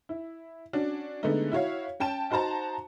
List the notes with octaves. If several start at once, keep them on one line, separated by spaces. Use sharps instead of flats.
E4
C#4 D4 F#4
D3 G#3 A3 B3 D#4
E4 F#4 C#5 F5
C#4 G5 A5 E7
D#4 F#4 C5 A5 A#5